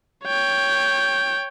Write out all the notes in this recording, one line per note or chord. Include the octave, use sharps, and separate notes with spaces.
C#5 G5